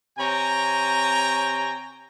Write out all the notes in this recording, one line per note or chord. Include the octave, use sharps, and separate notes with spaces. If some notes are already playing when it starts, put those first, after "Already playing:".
C3 C#5 G5 G#5 A#5